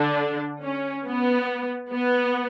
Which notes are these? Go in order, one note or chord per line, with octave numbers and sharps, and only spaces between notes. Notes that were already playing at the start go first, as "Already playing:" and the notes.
Already playing: D3 D4
C#4
B3
B3